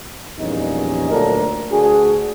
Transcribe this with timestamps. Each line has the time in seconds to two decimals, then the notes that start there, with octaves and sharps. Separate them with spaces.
0.39 A#1 E2 G2 A#2 C#4 D#4
1.11 D2 A#2 F#3 D4 A4 A#4
1.72 D2 D4 F#4 G#4